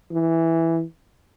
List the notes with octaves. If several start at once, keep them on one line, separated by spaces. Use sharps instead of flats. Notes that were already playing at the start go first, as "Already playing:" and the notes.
E3